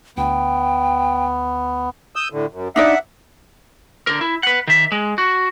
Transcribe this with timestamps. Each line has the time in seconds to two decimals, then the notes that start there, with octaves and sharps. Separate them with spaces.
0.17 D2 B3 G5
2.16 D#6 E6 G6
2.33 A2 D3
2.53 F#2
2.76 D4 D#4 D5 E5 F#5
4.07 D3 A#4
4.21 E4
4.43 B4 F#5
4.67 D#3 E5
4.92 G#3
5.18 F#4